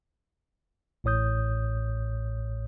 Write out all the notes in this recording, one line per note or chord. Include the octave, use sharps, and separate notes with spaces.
A1 A2 C#5 D#6 G6